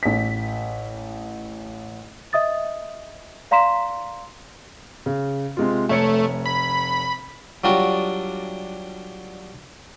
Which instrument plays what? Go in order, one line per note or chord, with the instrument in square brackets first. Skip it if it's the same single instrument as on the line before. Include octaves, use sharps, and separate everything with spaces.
[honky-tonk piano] A1 B6
[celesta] D#5 E5 D#6 A6
D5 F5 A#5 C6 B6 E7
[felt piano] C#3
C3 G#3 F4
[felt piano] F1 C#5 C#7 [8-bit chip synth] A3
[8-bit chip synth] B5
[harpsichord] F#3 G3 D4 F4 F#4